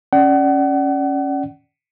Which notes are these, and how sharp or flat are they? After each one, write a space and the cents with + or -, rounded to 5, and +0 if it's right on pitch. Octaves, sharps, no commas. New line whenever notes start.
C#4 +0 D5 +5 F#5 +35